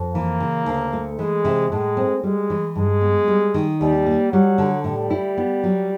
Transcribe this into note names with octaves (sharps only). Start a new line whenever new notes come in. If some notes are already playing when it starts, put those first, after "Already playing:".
Already playing: F2
E3 A#3
C#3
D2
A3
E3 G#3
C3
A2 G#3
C4
G3 G#3
E3
G2 G#3
B3
G3
D#3
D#2 G3
A#3
F#3 G3
D3
A2 G3
E4
B3
F#3